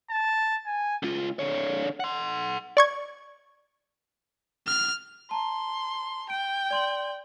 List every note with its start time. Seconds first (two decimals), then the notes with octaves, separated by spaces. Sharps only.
0.10 A5
0.66 G#5
1.03 C#2 F4
1.39 D3 C#5
2.00 F#5 C6
2.77 D5 C#6 G#6
4.67 F6
5.31 A5 A#5 C6
6.30 G5 D7
6.71 D5 C6 F#7